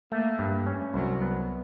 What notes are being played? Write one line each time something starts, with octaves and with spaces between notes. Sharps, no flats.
A3 A#3
G2
C#4
C2 F#3
B3